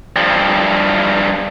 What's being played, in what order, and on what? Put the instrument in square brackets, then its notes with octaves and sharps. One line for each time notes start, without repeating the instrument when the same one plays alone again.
[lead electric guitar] G2 F3